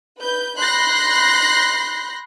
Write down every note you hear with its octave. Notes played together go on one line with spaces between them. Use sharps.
B4 G6
B5 C6 F#6 G6 A#6 C7